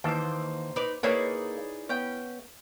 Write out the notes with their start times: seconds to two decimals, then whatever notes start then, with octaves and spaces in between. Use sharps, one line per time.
0.04 D#2 E3 A#3 C5 A5
0.76 D#4 B4 D5
1.03 A#3 D#4 E4 G#4 B4 C#5 D5
1.89 B3 C#4 G5